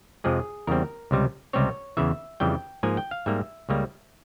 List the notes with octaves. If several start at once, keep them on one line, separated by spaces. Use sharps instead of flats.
F2 C3 F3 G#3 G#4
E2 C#3 G3 C4 A#4
C#2 C3 G3
C#2 C3 G3 C4 C#5
E2 C#3 E3 E5
F2 C#3 E3 G3 G5
G#2 F3 A#3 G#5
G5
F5
G#2 G3 A#3 E5
C#2 C#3 G3 A#3